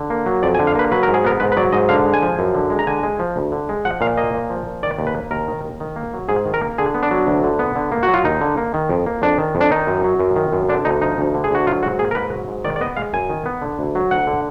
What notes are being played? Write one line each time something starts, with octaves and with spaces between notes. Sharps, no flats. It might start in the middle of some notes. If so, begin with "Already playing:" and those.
Already playing: D3
A#3
F#3
F2 D5
G#5
D3
F5
A#3 B4
F#3 B4
A#4
G#2
G#4
B3 A#4
G#2 B4
B4
F#3 D5
G#2 D#5
D3 F5
G#3
G#5
F3
F#2
D3
G#3
A#5
D3 G#5
G#3
F3
D2
D3
G#3
F3 F#5
A#2 F5
A#3 D#5
A#2
F3
A#2
D#3 D5
D#2
B4
A#3
D#2 A#4
D#3
D#2
D#3
A#3
F#3
G#2 G#4
D#3
A#4
A#3
D3 G#4
B3
D4
F#3
D2
D3
B3
D3
A#3
F#4
F#3
F4
D#2 D#4
D3
A#3
D#3
F2
A#3
F2 D4
D#3
F2
D4
D#3 D#4
F#2
F#3
F#2
D#3
F#2
D3 D4
D2 D#4
F3 D#4
D2
D3
G#4
D2 F#4
F#3 F4
G#2 F#4
A#3 G#4
A#4
G#2 B4
F#3
G#2
D#3 D5
D5
B3 D#5
G#3 F5
F#2 G#5
D#3
B3
D3
D2
F#3
D2 F#5
D3